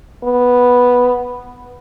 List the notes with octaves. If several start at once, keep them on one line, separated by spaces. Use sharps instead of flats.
B3